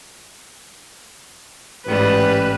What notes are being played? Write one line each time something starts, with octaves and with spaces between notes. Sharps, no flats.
A1 G#2 G3 B4